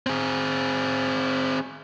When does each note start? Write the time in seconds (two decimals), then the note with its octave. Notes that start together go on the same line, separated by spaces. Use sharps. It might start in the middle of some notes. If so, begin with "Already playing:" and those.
0.07 C4 G#4